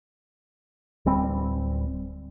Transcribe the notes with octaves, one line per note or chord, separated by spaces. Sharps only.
D1 G3 C4